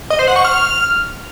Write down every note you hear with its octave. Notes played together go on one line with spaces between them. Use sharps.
D#5
C5
F#5
C#6
F6